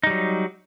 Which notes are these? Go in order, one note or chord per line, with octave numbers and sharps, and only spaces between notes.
F#3 G3 D#4